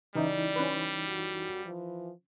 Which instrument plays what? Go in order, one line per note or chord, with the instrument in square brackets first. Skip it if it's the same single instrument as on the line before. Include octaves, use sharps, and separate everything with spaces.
[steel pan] C#3 [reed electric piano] E3 D#4 E4 [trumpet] G3 [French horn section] D5
[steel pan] C#4 B4
[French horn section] F#2 F#4
E3 F3